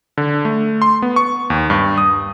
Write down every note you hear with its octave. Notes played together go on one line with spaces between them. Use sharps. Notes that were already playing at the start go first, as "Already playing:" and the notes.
D3
A3
C6
B3
C#6
D#2
G2
D#6